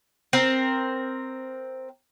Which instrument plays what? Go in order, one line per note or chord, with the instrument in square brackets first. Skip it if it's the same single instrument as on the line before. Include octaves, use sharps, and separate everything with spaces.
[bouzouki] C4 A#4